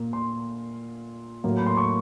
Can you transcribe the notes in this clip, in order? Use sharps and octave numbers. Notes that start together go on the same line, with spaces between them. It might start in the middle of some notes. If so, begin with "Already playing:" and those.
Already playing: A#2 A#3
C6
A2 F#3 A#3
B5
C6
C#6